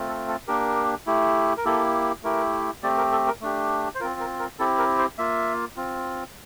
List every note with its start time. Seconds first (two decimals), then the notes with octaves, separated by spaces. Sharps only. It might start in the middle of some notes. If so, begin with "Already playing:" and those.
Already playing: A3 C4 F4
0.08 A4
0.28 A4
0.48 A#3 D4 G4 A#4
1.06 A3 E4 G4
1.57 A#4
1.65 A#3 E4 G4 A4
2.23 A3 E4 G4 A#4
2.83 A3 C4 G4 D5
2.98 A#4
3.12 A4
3.27 A#4
3.41 A3 D4 G4
3.95 C5
4.00 F4 A#4
4.03 C4
4.20 A#4
4.39 A#4
4.59 C4 E4 G4 A4
4.78 A#4
4.98 C5
5.18 A#3 F4 E5
5.77 C4 F4